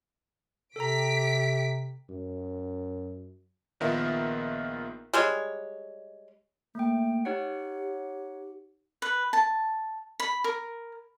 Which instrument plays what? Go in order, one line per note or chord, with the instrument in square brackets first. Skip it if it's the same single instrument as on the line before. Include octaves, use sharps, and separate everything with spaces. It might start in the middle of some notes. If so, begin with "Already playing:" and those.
[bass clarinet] C3 [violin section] G4 B6 D7 [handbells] A4 A#5
[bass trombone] F#2
[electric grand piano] A#1 D#3 B3 F4 A#4 E5
[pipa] G3 G#3 C#5
[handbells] A3 G5 [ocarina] A#3
[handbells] D#4 C#5 F#5 [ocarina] G4
[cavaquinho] B4
A5
B5
A#4